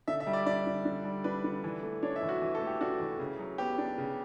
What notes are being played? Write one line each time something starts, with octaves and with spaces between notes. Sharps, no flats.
D3 E5
E5
G3
D5
D4 D5
D3
D3
G3
D4 B4
D3
E3
A3
D4 C#5
E5
E3
F#4
E3
A4
A3
G4
D4 F#4
E3
C#3
F#3
B3 G4
D4
C#3